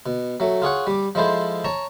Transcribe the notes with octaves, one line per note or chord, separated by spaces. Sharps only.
B2
F#3 A3
F4 G#4 C#5 F#5
G3 D6
F3 G#3 E4 A4 C5
C#5 A5 A#5